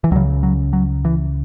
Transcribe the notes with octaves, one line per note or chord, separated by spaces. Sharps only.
E3
C#2 C#3 F#3
F#3
F#3
E3